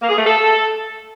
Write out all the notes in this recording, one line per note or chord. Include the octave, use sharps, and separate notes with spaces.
A#3
G#4
A3
A4